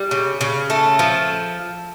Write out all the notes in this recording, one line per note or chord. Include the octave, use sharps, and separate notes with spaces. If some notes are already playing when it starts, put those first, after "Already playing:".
Already playing: G3
C#3
C#3
A3 A4
F3